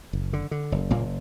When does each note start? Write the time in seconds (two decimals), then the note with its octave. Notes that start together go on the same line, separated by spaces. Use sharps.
0.13 F#1
0.33 D3
0.51 D3
0.72 F#1
0.90 F#1 A#2 A#3